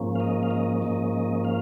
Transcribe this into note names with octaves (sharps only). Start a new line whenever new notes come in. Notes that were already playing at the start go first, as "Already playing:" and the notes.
Already playing: G#2 F3 A#3 C#4
F5
D#5
F5
D#5
G#2 F3 A#3 C#4 D#5
D#5
F5